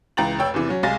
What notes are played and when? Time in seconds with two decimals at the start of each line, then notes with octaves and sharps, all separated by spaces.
0.17 C#2 E3 G5 A#5 A6 F#7
0.38 F1 C#5 G5 E6
0.54 E2 C3 E3
0.69 F#3 C#4
0.83 C2 G#3 F5 G#5 A6 A#6